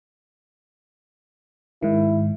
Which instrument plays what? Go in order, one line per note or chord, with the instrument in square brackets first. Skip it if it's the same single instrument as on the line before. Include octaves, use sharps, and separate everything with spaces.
[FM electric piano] G#2 D#3 [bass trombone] E4